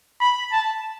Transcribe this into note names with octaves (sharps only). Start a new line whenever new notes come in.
B5
A5